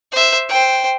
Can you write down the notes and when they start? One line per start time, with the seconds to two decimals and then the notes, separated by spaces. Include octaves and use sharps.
0.12 C5 E5
0.49 C5 G5